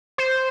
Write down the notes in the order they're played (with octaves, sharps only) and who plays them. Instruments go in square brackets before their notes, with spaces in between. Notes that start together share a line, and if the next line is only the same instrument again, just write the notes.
[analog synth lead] C5